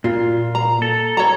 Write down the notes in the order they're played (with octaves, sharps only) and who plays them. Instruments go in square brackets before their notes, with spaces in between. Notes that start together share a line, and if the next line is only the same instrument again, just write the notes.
[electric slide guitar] A#2 [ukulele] F4
[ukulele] A#5
[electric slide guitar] A4
[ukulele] C#5 A#5